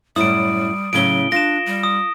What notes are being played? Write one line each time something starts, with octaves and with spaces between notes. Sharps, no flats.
F#2 A2 G3 E4 D#6 D7
A2 C#3 F#3 C#4 D7 G7
D4 F4 A#6 E7
G3
D#6